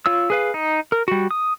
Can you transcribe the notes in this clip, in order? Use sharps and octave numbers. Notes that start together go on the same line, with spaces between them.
F4 C#5 E6
G#4 B4 F5
D#4
A#4
G3 F#4
D#6